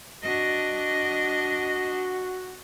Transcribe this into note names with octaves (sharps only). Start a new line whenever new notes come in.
D4 F#4 D#5